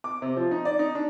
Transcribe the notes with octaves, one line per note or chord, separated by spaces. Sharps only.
D6
C3
F3
D#4
D5
D#4
D4